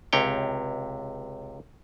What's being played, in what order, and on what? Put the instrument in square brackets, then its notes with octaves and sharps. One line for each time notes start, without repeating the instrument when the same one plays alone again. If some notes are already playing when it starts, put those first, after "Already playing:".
[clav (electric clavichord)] C#2 C3 C#5 G5